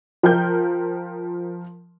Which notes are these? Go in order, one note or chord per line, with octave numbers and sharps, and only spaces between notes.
F3 A#4 G5 G6